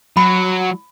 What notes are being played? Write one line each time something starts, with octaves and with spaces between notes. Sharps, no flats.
F#3 B5